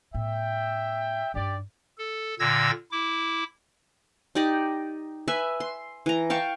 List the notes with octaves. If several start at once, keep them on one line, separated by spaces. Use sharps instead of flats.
A2 B3 E5 G5
G2 D#4 G4 D5
A4
A#2 D3 E6 G#6 A#6
E4 D6
D#4 G4 D5 D#5
B4 E5 G#5
C6
E3 A#5
F5 G5 A5 C#6